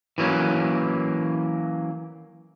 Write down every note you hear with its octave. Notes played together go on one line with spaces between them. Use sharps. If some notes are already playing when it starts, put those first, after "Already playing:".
E3 F#3 A#3 C#4